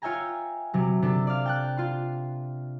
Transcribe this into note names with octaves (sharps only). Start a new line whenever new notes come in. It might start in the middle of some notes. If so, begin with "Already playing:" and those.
F4 C#5 E5 G5 G#5 A#5
C3 F#3
C3 D4 A4
D5 F5
G5 A5 F#6
F4 C6